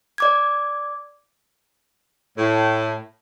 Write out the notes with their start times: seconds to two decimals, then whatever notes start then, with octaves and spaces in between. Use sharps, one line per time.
0.18 D5 D6 G#6
2.38 A2